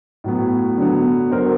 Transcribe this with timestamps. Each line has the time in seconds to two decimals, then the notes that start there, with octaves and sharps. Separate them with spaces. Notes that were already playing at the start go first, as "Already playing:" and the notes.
0.24 A2 F#3 B3
0.78 D3 F#3 B3
1.31 D3 F#3 B3 A#4 C5